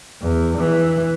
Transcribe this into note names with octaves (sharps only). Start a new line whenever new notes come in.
E2
E3